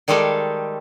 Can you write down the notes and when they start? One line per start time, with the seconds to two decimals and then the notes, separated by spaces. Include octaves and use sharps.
0.08 D#3 G3 G#3 G4 A4 F5